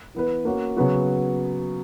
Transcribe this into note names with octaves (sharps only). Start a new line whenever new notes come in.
E3 B3 E4 B4
A#3 C#4 F#4
C#3 F#3 B3 F#4